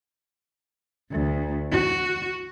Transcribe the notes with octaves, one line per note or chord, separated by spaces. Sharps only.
D2
F#4